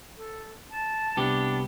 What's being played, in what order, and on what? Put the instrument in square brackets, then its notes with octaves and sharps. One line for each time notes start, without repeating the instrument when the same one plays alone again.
[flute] A4
A5
[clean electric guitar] C2 B3 G4 [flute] D4